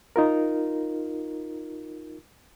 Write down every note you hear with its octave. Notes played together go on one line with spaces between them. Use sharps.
D#4 F4 A#4